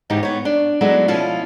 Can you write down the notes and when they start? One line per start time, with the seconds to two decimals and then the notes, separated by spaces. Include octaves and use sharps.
0.10 G#2 C#3 E3 D#4 G4
0.23 B3 C#5
0.45 D4
0.81 F#3 G#3 A3 B3 D4 E4
1.08 B2 F3 C#4 E4 F4